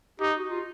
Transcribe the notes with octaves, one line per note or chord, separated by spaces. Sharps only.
D#4 G4
F#4
F4